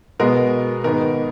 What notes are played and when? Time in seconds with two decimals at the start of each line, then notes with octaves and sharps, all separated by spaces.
0.19 B2 G#3 B3 A#4
0.84 G#2 D#3 G#3 B3 A#4